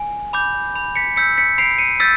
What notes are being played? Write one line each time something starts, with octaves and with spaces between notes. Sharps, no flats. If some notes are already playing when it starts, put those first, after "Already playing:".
Already playing: G#5
B5 D6 G6
B5
B6 C#7
E6 G6 B6 C#7
B6 C#7
B5 C7 D7
C#7 D#7
E6 G6 A6 B6